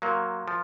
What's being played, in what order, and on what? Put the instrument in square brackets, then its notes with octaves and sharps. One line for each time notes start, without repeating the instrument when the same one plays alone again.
[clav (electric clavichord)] F#3 A#3 [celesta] A#4 F5 C6
[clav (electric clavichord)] F3